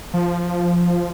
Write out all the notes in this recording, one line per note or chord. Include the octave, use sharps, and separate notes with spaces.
F3